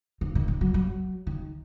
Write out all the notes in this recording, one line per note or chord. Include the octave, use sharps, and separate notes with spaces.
D#3
D#3
D#3
F#3
F#3
D#3